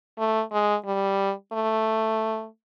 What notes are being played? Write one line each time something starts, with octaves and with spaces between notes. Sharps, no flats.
A3
G#3
G3
A3